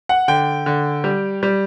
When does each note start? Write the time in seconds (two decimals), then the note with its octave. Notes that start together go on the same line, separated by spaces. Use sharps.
0.09 F#5
0.28 D3 G5
0.66 D3
1.04 G3
1.43 G3